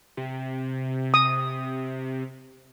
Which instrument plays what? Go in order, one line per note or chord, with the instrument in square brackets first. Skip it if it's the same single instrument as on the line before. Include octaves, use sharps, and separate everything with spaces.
[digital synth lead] C3
[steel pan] D#6